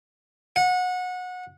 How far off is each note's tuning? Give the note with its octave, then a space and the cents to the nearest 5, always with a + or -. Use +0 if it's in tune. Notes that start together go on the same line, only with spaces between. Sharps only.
F#5 -25